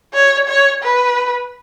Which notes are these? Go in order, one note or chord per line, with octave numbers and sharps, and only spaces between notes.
C#5
C#5
B4